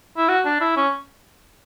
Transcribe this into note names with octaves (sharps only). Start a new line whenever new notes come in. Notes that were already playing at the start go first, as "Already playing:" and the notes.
E4
F#4
D4
E4
C#4